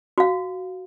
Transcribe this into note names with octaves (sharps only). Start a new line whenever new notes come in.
F#4 F5